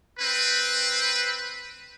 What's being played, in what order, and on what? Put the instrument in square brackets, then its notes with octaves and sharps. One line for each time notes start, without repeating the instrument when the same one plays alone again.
[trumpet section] C4 B4